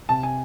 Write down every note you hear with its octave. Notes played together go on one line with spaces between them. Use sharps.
C3 A5
G#5